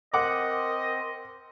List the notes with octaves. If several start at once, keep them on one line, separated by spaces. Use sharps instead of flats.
C4 A#4 D#5 F#5 D6